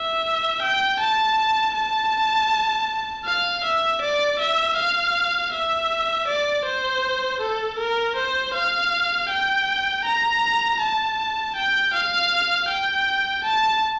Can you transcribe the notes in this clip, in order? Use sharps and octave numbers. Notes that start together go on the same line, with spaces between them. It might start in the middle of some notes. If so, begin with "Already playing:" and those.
Already playing: E5
G5
A5
A5
F5
E5
D5
E5
F5
E5
D5
C5
A4
A#4
C5
F5
G5
A#5
A5
G5
F5
G5
A5